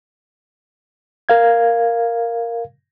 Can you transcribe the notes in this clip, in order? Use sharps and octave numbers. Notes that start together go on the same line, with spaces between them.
A#4 F5 G#6